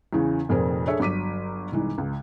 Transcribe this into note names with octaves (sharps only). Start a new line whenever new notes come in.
E2 C#3 E3
F1 F2 A#2 G#4 A#4 C5
D4 G#4 A4 C#5 E5
G1 F#3 D6 B6 D#7
C2 G#2 E3
C#2